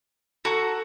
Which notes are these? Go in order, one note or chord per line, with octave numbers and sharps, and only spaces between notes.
F#4 A4 A#5